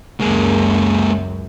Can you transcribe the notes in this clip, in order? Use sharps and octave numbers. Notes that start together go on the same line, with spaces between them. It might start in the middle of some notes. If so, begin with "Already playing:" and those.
C#2 F#2 G#3 A#3